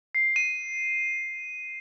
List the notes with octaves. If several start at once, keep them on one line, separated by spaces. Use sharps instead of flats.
C7
D#7